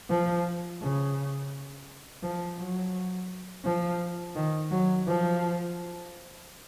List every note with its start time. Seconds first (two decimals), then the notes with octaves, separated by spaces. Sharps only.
0.09 F3
0.81 C#3
2.23 F3
2.59 F#3
3.65 F3
4.36 D#3
4.71 F#3
5.07 F3